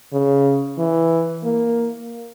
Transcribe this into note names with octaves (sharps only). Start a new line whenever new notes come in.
C#3
E3
A#3